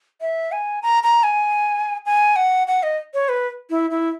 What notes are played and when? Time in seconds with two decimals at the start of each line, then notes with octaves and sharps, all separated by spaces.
0.21 E5
0.52 G#5
0.82 A#5
1.03 A#5
1.23 G#5
2.06 G#5
2.36 F#5
2.68 F#5
2.83 D#5
3.14 C#5
3.29 B4
3.70 E4
3.91 E4